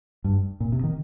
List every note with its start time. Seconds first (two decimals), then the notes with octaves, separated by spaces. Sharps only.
0.24 G2
0.60 A#2
0.72 C3
0.83 D#3